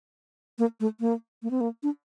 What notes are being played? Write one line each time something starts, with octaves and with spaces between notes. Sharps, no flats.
A#3
A3
A#3
A#3
C4
A#3
D4